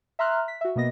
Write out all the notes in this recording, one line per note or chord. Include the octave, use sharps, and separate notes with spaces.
E5 A#5 C6 F6 F#6
B6
F#4 E5
B2 A#3 B3 D#5 A#6